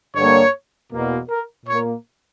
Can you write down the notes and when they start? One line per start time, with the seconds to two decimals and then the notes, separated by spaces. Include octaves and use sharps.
0.15 G2 D3 G3 A#3 C#5
0.91 E2 B2 A#3
1.29 A#4
1.66 A#2 A#3 C#5